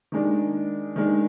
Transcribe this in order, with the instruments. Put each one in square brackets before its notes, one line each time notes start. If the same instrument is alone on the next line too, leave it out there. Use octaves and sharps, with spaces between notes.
[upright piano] D#3 G#3 D4
D#3 G#3 D4